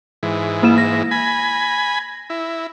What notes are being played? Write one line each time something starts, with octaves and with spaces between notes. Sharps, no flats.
G#2 E3
A#3 E4 E7
A#6
G#5 B5
E4